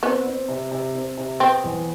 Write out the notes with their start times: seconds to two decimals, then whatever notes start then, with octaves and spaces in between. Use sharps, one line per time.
0.03 B3 C4
0.26 C4
0.49 C3
0.71 C3
0.95 C4
1.18 C3
1.40 B3 C4
1.64 E2